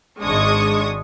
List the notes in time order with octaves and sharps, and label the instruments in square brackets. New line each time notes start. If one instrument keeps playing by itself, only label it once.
[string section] G#1 G#3 D4 C#6 D#6